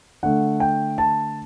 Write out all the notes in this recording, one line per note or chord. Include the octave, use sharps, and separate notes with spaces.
D3 A3 F#5
G5
A5